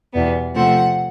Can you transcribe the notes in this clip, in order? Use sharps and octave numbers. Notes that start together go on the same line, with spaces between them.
E2 B2 G3 B3
C3 F3 A3 C4 F#5